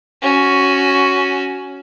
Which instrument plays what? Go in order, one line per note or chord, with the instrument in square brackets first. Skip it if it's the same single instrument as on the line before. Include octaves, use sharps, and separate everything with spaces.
[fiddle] C#4 F#4